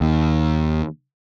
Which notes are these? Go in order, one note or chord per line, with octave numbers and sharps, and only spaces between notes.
D#2